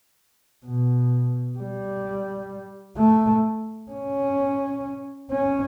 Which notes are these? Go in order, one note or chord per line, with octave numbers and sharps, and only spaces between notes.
B2
G3
A3
C#4
C#4